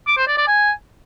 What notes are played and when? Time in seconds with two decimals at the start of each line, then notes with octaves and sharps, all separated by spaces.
0.07 D6
0.17 C5
0.27 D5
0.37 D5
0.47 G#5